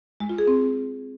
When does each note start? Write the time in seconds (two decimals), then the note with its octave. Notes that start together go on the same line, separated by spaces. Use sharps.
0.20 G#3
0.29 F4
0.38 G#4
0.47 C4